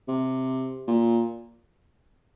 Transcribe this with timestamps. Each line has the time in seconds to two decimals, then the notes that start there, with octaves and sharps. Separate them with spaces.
0.08 C3
0.88 A#2